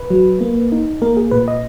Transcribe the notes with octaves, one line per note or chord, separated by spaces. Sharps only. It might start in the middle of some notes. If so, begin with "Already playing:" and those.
Already playing: B4
F#3
A#3
D#4
A#3 A#4
G#4
A#2 B4
D#5